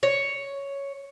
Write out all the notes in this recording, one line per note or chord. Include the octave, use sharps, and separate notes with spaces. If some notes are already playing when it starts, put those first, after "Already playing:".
C#5